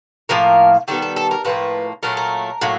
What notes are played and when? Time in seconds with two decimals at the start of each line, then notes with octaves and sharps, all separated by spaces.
0.29 A2 F3 A#3 A#4
0.88 D#3 G3 B3 A4
1.02 A4
1.16 A4
1.31 A#4
1.45 A2 F3 A#3 B4
2.03 A#2 F#3 A3 A#4
2.17 A#4
2.61 A2 F#3 A#3